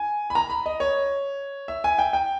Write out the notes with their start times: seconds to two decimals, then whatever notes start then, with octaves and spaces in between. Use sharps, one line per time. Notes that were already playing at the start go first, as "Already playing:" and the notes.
Already playing: G#5
0.30 B5
0.35 A#5
0.50 B5
0.66 D#5
0.80 C#5
1.68 E5
1.84 G#5
1.98 G5
2.13 G5